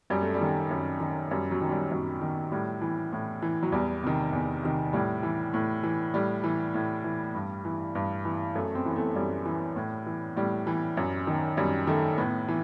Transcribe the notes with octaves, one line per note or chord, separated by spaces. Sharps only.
F#2 G3
A3
G3
D#3
F#2
D#3
F#2 G3
F#3
D#3
G3
F#2 F#3
D#3
A2 G3
E3
A2
E3
F#3
E2 G3
C3 D#3
E2
C3 D#3
A2 G3
E3
A2
E3
A2 G3
E3
A2
E3
G2
E3
G2
E3
F#2 A3
C4
E3
B3
A3
F#2 G3
E3
A2
E3
A2 G3
E3
F#2
D#3
F#2 G3
D#3 A3
A2 B3
E3